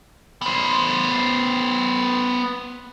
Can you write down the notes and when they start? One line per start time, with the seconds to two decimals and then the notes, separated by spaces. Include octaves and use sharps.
0.42 B3 C5